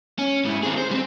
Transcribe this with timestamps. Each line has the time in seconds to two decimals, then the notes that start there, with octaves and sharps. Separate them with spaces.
0.18 C#4
0.45 G#2 E4
0.63 C4 G#4
0.78 C5
0.91 G3 C4